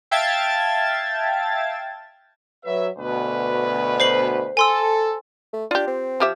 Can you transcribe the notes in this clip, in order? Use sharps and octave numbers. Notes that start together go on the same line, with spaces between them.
E5 F5 G5 A5 G#6 A6
F#3 B4 E5
D2 B2 B4
C5 C7 F#7
A4 G#5 C6 E6
A3
D4 F4 G4
C4
F3 G4 E5